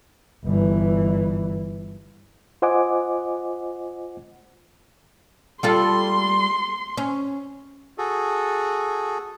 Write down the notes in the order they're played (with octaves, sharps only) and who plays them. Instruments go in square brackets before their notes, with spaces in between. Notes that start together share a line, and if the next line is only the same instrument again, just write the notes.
[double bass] G1 E3
[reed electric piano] F4 C5 D#5 F#5 G#5 D6
[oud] G3 F4 A4 [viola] C6
[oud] C#4
[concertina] F#4 G#4 A4